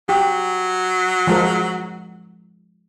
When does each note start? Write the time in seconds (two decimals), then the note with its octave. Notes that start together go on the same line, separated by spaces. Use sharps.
0.09 F#3 G4
1.27 F3 G#3 A#4